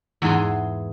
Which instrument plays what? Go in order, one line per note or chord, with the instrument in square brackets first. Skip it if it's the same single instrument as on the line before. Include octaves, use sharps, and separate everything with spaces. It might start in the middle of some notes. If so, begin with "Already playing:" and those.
[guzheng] E2 G#2 E3 G#4 C6